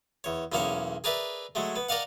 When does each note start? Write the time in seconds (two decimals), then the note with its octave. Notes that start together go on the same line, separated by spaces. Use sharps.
0.24 E2 C#5
0.52 B1 E2 A#3 C#4 G#4 C#5
1.04 G#4 A#4 B4 D5 E5
1.55 F#3 G#3 A3
1.76 B3
1.89 A#4 D5 D#5 F5 F#5